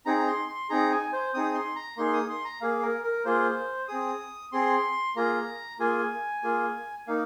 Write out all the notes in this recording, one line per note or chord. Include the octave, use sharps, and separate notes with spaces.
C4 D#4 G#4 A#5
A#5
C6
C6
C4 D#4 G#4 A#5
G#5
C5
C4 D#4 G#4 D#6
C6
A#5
A#3 D#4 G#4 C6
D#6
C6
A#5
A#3 G#4 F5
A#4
A#4
A#3 F4 G#4 C5
C4 G#4 D#6
C4 G#4 C6
A#3 F4 G#4 A#5
A#3 F4 G#4 G#5
A#3 F4 G#4
A#3 D#4 F5